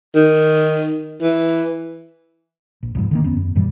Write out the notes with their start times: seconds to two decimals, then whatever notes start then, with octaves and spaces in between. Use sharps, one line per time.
0.15 D#3
1.22 E3
2.83 A#1
2.95 B1 F2 G#2
3.11 D3 D#3 A#3
3.24 E2 B3 C#4
3.37 F#2
3.55 F#2 A#2 E3 G3